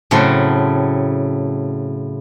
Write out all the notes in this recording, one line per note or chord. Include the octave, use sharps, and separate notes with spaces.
A2 C#3 F#3 A3 C4